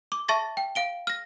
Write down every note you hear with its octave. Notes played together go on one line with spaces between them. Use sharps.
D6
E5 A5 C#6 A6 A#6
G5
F5 D7 G7
F6 A#6